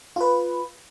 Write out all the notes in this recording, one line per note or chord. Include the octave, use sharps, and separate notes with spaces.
F4 B4